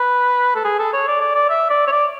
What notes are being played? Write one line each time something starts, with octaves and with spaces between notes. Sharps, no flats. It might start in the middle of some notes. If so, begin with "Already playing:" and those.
Already playing: B4
A4
G#4
A4
C#5
D5
D5
D5
E5
D5
C#5
D5